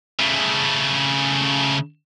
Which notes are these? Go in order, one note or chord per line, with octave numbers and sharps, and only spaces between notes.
C#3 A3